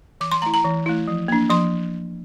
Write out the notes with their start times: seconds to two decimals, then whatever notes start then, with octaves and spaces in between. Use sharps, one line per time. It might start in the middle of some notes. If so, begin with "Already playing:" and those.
0.21 E3 D6
0.32 C6
0.42 A3 E4 A#5
0.54 A#5
0.65 E3
0.86 A3 E4
1.08 F3
1.28 A#3 D4
1.50 F3 C6